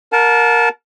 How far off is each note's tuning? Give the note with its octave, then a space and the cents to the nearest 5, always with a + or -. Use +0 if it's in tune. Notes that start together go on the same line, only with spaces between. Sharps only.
A#4 +0 F#5 -40 A5 -20